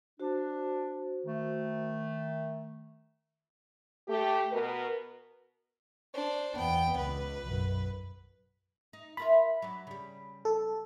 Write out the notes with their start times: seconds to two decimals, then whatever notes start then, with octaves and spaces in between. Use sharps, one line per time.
0.20 D4 F#4 C5
1.25 D#3 A3
4.08 A3 G4
4.52 B2 A#4 B4
6.14 D4 C5
6.56 E2 B3 G5
6.97 C#2 B4
7.44 B1 F#2
8.93 D#4
9.17 F4 A#4 E5 B5
9.62 F#3 D4
9.87 C#3 G3
10.45 A4